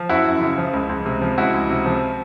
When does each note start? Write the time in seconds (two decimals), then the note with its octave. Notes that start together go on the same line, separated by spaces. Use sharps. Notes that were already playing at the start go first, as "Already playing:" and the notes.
Already playing: F3
0.09 F#2 E4 F#4
0.26 F#2
0.41 C#3
0.58 F3
0.73 C#2
0.89 C#2
1.06 C3
1.22 F3
1.38 C#2 E4 F#4
1.54 C#2
1.70 C3
1.86 F3